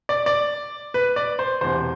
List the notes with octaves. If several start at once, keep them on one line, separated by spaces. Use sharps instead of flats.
D5
D5
B4
D5
C5
E1 E2 C3 C5